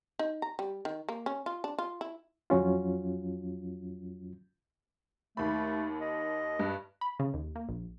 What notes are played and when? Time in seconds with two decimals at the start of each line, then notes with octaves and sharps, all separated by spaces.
0.19 D#4
0.42 A#5
0.59 G3
0.85 D#3
1.09 A#3
1.26 C#4
1.46 F4
1.64 D4
1.79 F4
2.01 E4
2.50 F2 F#3 C#4 F4
5.37 D#2 A3 B5
6.01 D#5
6.59 G2
7.01 B5
7.19 C#3
7.34 D#2
7.56 A#3
7.69 A#1